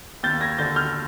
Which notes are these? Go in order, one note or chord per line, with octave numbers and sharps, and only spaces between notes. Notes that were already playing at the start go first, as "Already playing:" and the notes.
D#2 G6 A6
G#6 A#6
D3 G6 A6
F6 G6